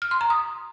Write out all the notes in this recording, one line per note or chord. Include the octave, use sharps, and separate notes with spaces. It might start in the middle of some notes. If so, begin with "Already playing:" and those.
F6
C6
A#5
D#6